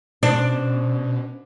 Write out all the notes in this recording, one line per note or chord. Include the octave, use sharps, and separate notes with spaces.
B2 C#4 D4 C5